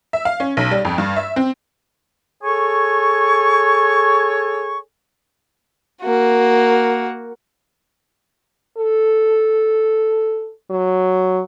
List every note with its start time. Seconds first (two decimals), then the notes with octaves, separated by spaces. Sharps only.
0.13 E5
0.25 F5
0.40 C#4
0.57 B1
0.71 G3
0.85 F2
0.98 G2
1.16 E5
1.36 C4
2.42 G#4 A4 C#5 G#5 C#6
6.02 A#3 F#4
8.77 A4
10.70 F#3